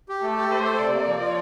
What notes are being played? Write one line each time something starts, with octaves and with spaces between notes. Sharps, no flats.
G4
A3 A4
G4
A3 C5
A4
C3 D5
A#3
F3
F4